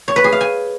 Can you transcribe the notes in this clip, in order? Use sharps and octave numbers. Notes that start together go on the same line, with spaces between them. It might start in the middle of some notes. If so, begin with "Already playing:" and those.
C#5
B4
G#4
F5
G#5